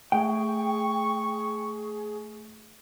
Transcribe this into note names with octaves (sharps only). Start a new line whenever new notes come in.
A3 G#4 G5 C#6